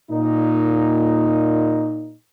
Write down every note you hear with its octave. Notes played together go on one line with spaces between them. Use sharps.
A#2 D#4